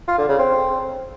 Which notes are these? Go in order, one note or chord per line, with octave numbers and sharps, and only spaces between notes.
F4
D3
C#3
C4